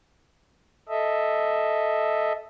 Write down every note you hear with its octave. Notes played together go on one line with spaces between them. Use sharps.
A4 D#5 E5